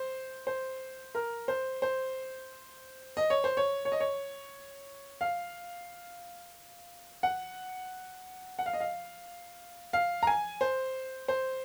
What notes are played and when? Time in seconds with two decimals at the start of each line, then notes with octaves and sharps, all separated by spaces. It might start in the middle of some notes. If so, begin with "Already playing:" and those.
Already playing: C5
0.47 C5
1.15 A#4
1.48 C5
1.82 C5
3.17 D#5
3.30 C#5
3.44 C5
3.57 C#5
3.85 C#5
3.92 D#5
4.00 C#5
5.21 F5
7.23 F#5
8.59 F#5
8.66 F5
8.73 D#5
8.80 F5
9.93 F5
10.23 A#5
10.27 G#5
10.61 C5
11.28 C5